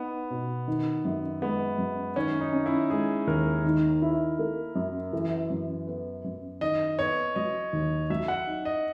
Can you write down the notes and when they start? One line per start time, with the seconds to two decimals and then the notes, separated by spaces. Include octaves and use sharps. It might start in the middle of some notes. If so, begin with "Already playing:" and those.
Already playing: B3 D#4
0.30 B2
0.68 D#3
1.05 F#2
1.42 G#3 B3
1.79 F#2
2.16 D#3 C#4
2.41 D#4
2.53 C#4
2.66 E4
2.90 G#3 G#4
3.27 D#2 A#4
3.64 D#3
4.02 E4
4.39 A#3
4.76 F#2
5.13 E3
5.50 F#2
5.87 B3
6.25 F#2
6.61 D#3 D#5
6.99 B3 C#5
7.36 F#3 D#5
7.73 D#2
8.10 F#3 E5
8.28 F#5
8.47 D#4
8.65 D#5